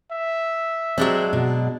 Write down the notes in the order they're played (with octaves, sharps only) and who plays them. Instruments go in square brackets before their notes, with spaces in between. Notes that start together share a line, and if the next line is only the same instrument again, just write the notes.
[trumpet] E5
[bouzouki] F#3 G#3 D4 [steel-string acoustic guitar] C4
[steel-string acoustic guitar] B2